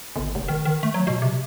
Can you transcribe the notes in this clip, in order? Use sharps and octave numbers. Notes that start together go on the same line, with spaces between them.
G1
F1
D#3
D#3
A3
F#3
B2
C3